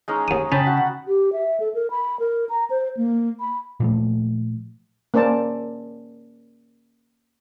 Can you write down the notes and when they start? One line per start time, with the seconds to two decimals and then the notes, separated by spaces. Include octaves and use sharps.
0.08 G#3 C#4 D#4
0.28 D#2 D#6
0.52 C#3 C#4 G5 A5 B5
0.67 F#4
1.08 G4
1.33 E5
1.60 A4
1.75 A#4
1.90 B5
2.20 A#4
2.49 A#5
2.70 C5
2.97 A#3
3.40 B5
3.80 A#2 F3 A3
5.14 A#3 C#4 C5 D5 A5